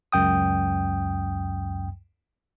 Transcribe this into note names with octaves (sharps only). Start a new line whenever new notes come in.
C#2 F#2 G5 D#6